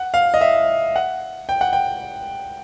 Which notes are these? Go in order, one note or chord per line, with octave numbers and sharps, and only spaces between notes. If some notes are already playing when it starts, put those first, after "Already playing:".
Already playing: F#5
F5
D#5
E5
F#5
G5
F#5
G5